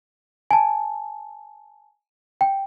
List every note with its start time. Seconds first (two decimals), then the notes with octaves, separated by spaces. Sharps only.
0.51 G#5 A5
2.41 G5